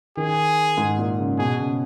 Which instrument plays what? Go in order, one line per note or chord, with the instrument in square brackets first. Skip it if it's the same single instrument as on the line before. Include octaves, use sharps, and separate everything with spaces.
[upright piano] D#3 [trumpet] G#4
[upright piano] G#2
A#2
C#3
[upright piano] B2 [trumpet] G#4
[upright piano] C#3